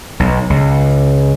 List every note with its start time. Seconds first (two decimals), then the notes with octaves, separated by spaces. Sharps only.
0.20 B1
0.50 C#2